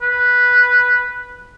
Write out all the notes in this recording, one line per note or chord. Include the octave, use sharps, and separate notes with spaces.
B4